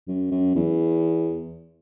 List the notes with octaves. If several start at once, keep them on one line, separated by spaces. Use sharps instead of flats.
F#2
F#2
E2